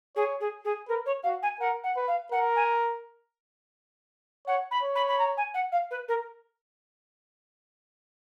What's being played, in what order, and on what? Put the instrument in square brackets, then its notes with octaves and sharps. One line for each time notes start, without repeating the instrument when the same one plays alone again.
[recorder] G#4 [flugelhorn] C#5
[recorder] G#4
G#4
[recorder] A#4 [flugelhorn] B4
[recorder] C#5
[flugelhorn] F#4 [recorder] F5
[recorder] G#5
[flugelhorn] A#4 [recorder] F#5
[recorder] F#5
[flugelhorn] B4
[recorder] F5
[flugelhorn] A#4 [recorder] F#5
[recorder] G#5
[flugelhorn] C#5 [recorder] F#5
[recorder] B5
[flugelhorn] C#5
[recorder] B5
B5
A#5
G#5
F#5
F5
B4
A#4